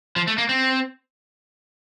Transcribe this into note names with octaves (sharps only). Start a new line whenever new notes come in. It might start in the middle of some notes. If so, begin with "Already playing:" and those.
F3
A3
A#3
C4